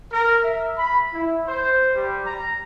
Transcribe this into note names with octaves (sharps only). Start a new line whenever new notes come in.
A#4
E5
B5
E4
C5
G3
A#5